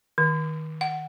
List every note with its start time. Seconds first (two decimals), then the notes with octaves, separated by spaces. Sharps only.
0.18 D#3
0.81 F#5